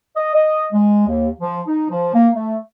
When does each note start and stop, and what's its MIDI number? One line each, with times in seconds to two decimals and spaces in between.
0.17 0.33 75
0.34 0.65 75
0.72 1.05 56
1.08 1.28 39
1.41 1.61 53
1.68 1.88 63
1.90 2.12 53
2.14 2.29 58
2.35 2.57 57